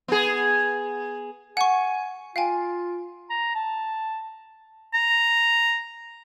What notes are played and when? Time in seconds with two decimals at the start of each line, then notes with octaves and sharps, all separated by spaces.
0.08 B3 G#4
1.57 F#5 G#5 C#6
2.36 F4 F5 G5 G#5
3.30 A#5
3.55 A5
4.94 A#5